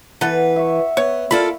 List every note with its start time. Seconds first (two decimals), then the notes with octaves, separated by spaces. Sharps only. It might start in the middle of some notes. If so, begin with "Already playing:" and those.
0.21 E3 B3 A4 B4 F#5
0.56 E5 C#6
0.97 B3 C#5
1.31 A#3 F4 A4 D5 B5